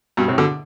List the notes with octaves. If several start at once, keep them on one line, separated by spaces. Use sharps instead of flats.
G2 B2
A2 C3
B2 D3